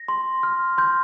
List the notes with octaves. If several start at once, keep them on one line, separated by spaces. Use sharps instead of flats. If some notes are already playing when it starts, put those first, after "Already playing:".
Already playing: A#6
C6
F6
C6 G6